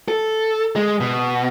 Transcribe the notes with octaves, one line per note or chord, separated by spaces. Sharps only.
A4
G#3
B2